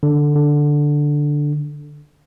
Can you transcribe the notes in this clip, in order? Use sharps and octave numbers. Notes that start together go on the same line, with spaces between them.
D3
D3